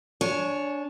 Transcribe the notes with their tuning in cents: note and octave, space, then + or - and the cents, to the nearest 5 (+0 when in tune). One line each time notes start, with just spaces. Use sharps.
D4 -15 C#5 +0 G#5 +15